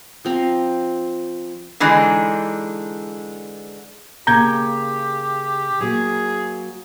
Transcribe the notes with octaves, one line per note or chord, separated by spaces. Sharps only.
F3 C4 A#5
D3 E3 G#3 D4 D#4
C#3 A#3 C#4 G4 A#5 G6 G#6
F#3 A#3 G#4